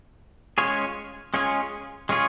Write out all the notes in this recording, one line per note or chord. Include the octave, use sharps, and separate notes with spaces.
G#3 C#4 F4 G#4 C#5
G#3 C#4 F4 G#4 C#5
G#3 C#4 F4 G#4 C#5